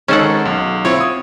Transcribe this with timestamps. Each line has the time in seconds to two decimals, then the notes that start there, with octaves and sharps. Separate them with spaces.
0.08 D#3 G#3 C#4 D#4 A4 F#5
0.45 B1
0.85 C4 E4 F4 C#5
1.01 D#6